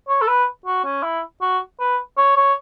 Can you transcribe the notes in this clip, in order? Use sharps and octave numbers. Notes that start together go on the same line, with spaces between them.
C#5
A4
B4
F#4
C#4
E4
F#4
B4
C#5
C#5